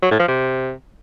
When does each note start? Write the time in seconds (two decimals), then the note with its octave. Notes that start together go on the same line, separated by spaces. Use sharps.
0.03 F#3
0.11 A2
0.20 F3
0.28 C3